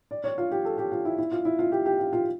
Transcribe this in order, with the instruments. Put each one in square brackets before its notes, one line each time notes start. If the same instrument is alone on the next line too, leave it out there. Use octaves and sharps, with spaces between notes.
[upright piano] D5
C#5
F4
G4
A4
G4
F4
E4
E4
F4
E4
F4
G4
G4
F4
F4